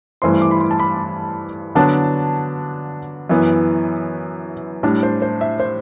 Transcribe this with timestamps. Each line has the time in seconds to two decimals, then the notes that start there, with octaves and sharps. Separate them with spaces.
0.22 G2 E3 A3 C4 C6
0.42 D6
0.51 B5
0.60 C6
0.71 A5
0.79 B5
1.75 D3 F#3 B3 D4 A5
3.29 F#2 E3 B3
4.83 A2 G3 D4 A5
5.03 C5
5.22 C5
5.41 E5
5.60 C5